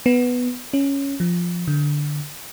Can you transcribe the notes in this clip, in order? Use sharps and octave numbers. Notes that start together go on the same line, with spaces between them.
B3
C#4
F3
D3